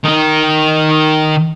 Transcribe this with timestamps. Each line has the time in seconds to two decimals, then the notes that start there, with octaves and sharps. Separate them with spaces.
0.04 D#3 D#4